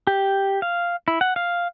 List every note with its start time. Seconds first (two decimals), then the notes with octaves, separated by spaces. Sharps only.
0.07 G4
0.62 F5
1.08 E4
1.21 F#5
1.36 F5